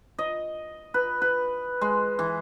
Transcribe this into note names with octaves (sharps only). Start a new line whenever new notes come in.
D#5
B4
B4
G#3
E3